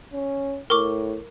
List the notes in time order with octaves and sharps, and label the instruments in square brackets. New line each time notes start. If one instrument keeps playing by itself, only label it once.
[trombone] C#4
[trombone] A2 [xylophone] A#4 C#6 D6